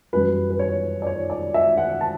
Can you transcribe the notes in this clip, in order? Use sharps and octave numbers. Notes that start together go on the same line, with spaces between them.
F#2 E3 G3 B4
B4
C#5
D5
C#5
D5
E5
F#5
A5